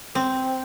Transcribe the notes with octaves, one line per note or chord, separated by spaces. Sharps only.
C4